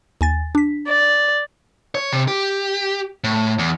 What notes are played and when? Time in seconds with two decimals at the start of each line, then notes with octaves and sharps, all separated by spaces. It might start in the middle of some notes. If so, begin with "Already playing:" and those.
0.21 D#2 G#5 A6
0.55 D4 B6
0.88 D5
1.95 C#5
2.13 C3
2.28 G4
3.24 A2
3.59 E2